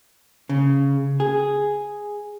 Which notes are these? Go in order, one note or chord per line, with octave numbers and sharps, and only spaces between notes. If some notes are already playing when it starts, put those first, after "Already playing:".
C#3
G#4